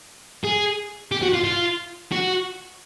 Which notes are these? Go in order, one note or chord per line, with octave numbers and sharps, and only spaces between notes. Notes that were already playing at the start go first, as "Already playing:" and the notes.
G#4
G4
F#4
F4
F4
F#4